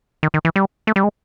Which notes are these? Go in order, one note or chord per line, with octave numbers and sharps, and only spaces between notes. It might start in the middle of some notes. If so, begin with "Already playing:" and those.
D#3
D#3
E3
G3
A3
G3
G#3